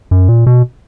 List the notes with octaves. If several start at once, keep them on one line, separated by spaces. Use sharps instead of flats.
F#2
A#2
B2